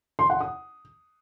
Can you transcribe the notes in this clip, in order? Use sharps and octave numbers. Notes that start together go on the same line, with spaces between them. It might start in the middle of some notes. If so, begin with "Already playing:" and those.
C6
F#5
D#6